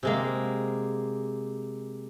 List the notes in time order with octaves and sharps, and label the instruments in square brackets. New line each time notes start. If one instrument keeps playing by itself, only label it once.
[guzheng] C3 G#3 A#3